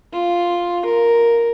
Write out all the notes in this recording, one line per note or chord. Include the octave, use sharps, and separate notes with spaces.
F4
A#4